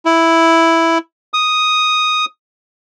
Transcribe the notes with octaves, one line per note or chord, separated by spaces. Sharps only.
E4
D#6